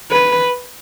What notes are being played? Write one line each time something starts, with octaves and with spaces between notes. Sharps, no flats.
B4